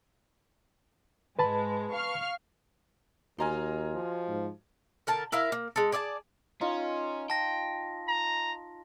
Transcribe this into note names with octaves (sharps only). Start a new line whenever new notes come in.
G#2 G#3 B4 A5 B5
F5 C#6 F6
D#2 F#4 D#5 G#5 A#5 C6 F6
F3
G#2
D3 A#4 A5
E4 A#4 E5 F5
A#3
G#3 A4
G#4 D5 E5 A5
C#4 D#4 F4
G5 A5 A#6
A#5